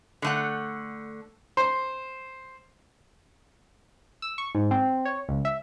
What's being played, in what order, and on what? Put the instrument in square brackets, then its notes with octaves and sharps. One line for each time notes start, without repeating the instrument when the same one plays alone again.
[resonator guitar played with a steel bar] D3 A3 F#5
[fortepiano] C5
[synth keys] E6
C#6
G#2
C4
C#5
C#2
E5